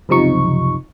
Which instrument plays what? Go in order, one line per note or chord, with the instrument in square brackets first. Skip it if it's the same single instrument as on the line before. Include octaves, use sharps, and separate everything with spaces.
[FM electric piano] C#2 F#2 C3 F3 D#4 C#6